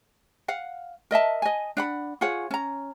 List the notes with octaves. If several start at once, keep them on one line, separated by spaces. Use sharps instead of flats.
F5 F#5
A#4 D#5 E5 A5
D#5 G#5
D4 F#5 B5
F4 G#4 C#5 F#5
C#4 A#5